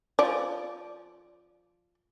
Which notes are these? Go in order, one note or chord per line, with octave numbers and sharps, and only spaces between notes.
F3 D5